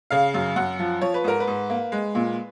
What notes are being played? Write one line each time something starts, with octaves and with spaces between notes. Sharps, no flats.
C#3 F5
F#2
F#2 F#5
F3
F3 C#5
B4
G#2 A#4
B4
G#2
A#3
G#3
A#2